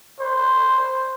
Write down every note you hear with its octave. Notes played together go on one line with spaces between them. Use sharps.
C5